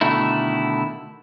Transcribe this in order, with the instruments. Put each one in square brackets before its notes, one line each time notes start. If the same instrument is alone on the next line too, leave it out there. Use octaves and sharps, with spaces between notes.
[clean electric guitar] B2 D3 D#3 A3 E4